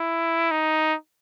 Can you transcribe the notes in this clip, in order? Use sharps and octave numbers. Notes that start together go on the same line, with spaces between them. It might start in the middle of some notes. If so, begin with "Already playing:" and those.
Already playing: E4
D#4